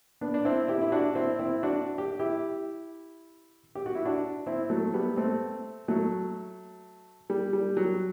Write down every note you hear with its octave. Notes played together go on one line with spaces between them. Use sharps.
B3 D4
D4
C4 E4
E4 G4
E4
D4 F#4
C4 E4
C4 E4
D4 F#4
G4
E4 G4
G4
F#4
E4
D4 F#4
C4 E4
F#3 A3
G3 B3
A3 C4
F#3 A3
G3
G3
F#3